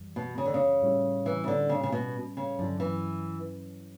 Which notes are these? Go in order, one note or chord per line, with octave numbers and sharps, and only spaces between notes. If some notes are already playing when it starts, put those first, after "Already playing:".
Already playing: F#2 E3 G3
B2
C#3
D3
C#3
A2 G3 C#4 E4
E3
C#3
D3
C#3
C#3
B2
C#3
G2 D3 F#3 C#4 E4
E3